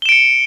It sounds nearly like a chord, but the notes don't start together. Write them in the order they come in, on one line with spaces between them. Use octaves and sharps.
G7 E7 D7 C#7